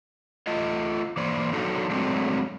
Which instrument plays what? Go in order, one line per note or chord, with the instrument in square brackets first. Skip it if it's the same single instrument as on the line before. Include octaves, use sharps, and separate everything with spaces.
[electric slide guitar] A3 F4 D#5
E3 A#3 C5 D5
F#3 D4 D#4 A4
F#3 G#3 A3 C4 D4